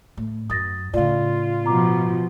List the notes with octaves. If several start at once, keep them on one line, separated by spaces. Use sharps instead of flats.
A2
F#2 D#6 A6 A#6
A2 C#3 F4 D5 F5
B2 F3 A#5 D6